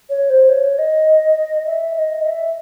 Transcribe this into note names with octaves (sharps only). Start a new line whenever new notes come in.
C#5
C5
C#5
D#5
E5
E5
D#5
E5